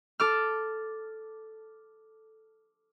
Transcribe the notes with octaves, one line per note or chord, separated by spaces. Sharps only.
A4 D6 F6